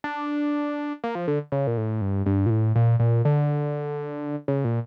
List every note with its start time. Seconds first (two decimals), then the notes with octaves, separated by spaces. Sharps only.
0.04 D4
1.04 A#3
1.15 F3
1.28 D3
1.52 C#3
1.67 A#2
1.77 A2
2.01 G2
2.26 G2
2.46 A#2
2.50 A2
2.76 A#2
3.00 A#2
3.25 D3
4.48 C#3
4.64 A#2